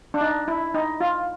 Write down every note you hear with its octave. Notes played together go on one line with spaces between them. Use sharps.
D4
D#4
E4
D#4
F4